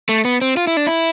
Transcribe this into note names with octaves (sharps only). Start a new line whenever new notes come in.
A3
B3
C4
F4
E4
D4
E4